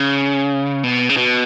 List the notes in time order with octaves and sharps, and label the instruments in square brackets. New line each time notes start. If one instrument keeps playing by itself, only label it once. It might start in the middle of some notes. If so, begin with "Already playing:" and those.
Already playing: [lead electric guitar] C#3
B2
C#3
B2